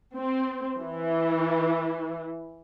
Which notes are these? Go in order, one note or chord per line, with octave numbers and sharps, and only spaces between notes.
C4
E3